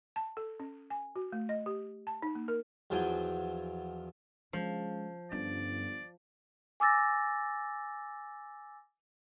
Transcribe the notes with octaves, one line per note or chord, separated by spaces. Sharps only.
A5
A4
C#4
G#5
F#4
A3
D#5
G4
A5
D#4
A#3
A#4
E2 F3 F#3 G5 G#5
C#3 F3 G#3
G1 G2 C#4 D5
G#5 D6 E6 A6 A#6